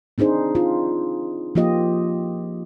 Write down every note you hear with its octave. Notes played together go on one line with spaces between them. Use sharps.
C4 D4 D#4 G#4 C5
F4
F3 A#3 F4 G4 D#5